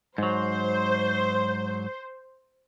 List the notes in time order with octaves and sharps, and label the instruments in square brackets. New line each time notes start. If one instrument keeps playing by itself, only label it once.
[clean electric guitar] G#2 F#3 [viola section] C5